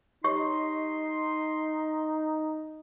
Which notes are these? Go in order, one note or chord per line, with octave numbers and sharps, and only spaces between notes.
D#4 G4 C#5 D#5 C6 C#6